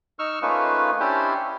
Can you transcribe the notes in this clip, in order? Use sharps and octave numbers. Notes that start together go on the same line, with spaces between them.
D#4 C#6 E6 F6
A3 A#3 C#4 D#4 F4 B4
C#4 D4 E4 G4 C5